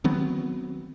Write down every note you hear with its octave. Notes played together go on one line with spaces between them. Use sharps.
D#3 F#3 B3 C4